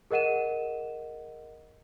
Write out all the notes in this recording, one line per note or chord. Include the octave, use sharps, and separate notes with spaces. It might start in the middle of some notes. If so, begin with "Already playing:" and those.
G#4 A#4 D#5 F#5 D#7 E7